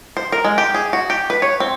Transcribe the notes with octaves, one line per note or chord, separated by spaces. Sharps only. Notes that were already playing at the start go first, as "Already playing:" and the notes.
C5
A#4
G#3
G4
G#4
F#4
G4
B4
C#5
C4